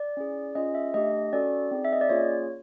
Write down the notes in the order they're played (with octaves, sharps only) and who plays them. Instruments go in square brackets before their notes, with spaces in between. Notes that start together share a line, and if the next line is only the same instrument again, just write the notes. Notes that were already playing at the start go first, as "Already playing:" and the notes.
Already playing: [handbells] D5
C#4 E4 G#4
C#4 F4 G#4 D#5
E5
A3 D4 G4 D#5
C#4 F#4 A4 D5
C4 D#4 G#4
E5
D#5
D5
A#3 C#4 F4 G#4 C#5